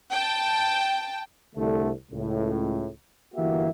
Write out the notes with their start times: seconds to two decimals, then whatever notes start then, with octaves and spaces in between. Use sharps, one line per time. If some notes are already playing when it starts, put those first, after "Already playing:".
0.11 G5 A5
1.56 C2 D3 A3
2.11 C#2 A2
3.35 G1 E3 A#3 F#4 G4 E5